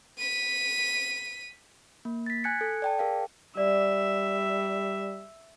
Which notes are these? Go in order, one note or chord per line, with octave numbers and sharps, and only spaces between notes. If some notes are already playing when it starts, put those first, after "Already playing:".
B6 D#7
A#3
A6 B6
G#5 F#6 G#6 C#7
A4
D5 G5 A5
G#4 A#4 F5 G5
G3 D5 E5